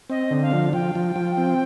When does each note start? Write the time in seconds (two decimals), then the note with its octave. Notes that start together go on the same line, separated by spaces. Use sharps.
0.10 C4 D#5
0.31 D3
0.42 F5
0.53 F3
0.73 F3 G5
0.95 F3
1.16 F3
1.37 C4